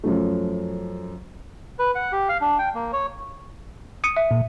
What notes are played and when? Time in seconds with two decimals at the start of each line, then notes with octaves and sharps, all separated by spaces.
0.04 F#2 F3 A3
1.79 B4
1.95 F#5
2.12 G4
2.29 F5
2.41 D4
2.59 G5
2.75 A#3
2.93 C#5
4.04 D#6 C#7 D#7
4.17 E5
4.31 A#2